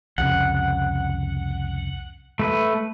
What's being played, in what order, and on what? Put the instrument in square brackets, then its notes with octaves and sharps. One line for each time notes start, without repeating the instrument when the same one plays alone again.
[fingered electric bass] C2 F2 C#3 [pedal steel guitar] F#5
[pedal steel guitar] A3 B4